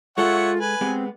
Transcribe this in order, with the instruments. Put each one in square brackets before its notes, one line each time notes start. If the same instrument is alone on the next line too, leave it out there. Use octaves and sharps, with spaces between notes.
[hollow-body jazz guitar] G#3 A4 [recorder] F4 [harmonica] C#5 E5 F#5
[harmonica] B4 G#5
[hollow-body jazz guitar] G#3 B3 G4 [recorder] C4